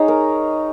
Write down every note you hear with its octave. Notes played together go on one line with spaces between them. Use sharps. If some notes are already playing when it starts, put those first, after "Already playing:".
Already playing: D#4 G#4 C#5
A#4